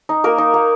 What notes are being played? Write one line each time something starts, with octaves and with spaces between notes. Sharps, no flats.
D#4
A#3 A#4
D#4
A#3